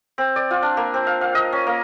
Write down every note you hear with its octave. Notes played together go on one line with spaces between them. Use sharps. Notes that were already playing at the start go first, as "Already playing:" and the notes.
C4
D5
F4
D4
A#3
C4
F5
F5
D#5
C#4
A#3